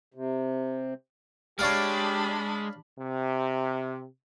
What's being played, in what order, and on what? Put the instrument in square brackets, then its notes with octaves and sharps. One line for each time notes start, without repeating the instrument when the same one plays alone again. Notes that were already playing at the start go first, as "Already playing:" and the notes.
[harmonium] C3
[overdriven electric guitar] G#3 [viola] D4 B5 [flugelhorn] G4 [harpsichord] C#5 D5 F5
[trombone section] C3